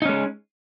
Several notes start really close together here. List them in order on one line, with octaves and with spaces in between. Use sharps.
D#4 C#4 G#3